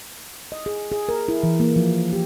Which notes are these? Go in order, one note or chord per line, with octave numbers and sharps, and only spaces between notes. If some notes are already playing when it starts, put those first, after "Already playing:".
D#5
G#4
G#4
A#4
E4
E3
A#3
F3
G4